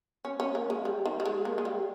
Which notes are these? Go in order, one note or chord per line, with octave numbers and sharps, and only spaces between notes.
C#4
C#4
A#3
G#3
G3
D#3
G3
G#3
A#3
G#3
G3